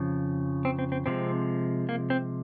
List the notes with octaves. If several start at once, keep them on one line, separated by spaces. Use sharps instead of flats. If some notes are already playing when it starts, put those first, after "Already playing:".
Already playing: F2 C#3 F3
C4
C4
C4
C3 F3 G#3 C4
A#3
C4